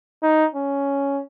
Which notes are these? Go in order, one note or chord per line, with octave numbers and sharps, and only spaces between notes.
D#4
C#4